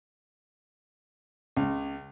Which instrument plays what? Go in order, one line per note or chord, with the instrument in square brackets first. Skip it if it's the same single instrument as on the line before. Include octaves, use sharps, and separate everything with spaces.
[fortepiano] C#2